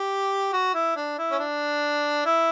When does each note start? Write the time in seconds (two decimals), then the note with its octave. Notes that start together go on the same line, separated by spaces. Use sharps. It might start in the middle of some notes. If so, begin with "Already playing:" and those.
Already playing: G4
0.53 F#4
0.74 E4
0.96 D4
1.18 E4
1.31 C#4
1.39 D4
2.25 E4